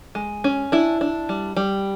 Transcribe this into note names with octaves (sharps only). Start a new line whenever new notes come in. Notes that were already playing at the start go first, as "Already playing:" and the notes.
G#3
C#4
D4 E4
D4
G3
G3